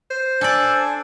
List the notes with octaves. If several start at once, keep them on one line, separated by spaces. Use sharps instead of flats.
C5
D4 A4 D5 G#5